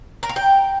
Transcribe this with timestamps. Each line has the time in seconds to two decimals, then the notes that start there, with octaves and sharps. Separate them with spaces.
0.23 A#4
0.29 F5
0.36 G5